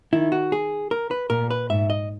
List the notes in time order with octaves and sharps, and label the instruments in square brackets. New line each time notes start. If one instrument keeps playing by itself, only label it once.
[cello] D#3 [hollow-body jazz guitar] E4
[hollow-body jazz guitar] F#4
G#4
A#4
B4
[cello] A#2 [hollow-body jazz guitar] A#4
[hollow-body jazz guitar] B4
[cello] G#2 [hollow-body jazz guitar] E5
[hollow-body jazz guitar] D#5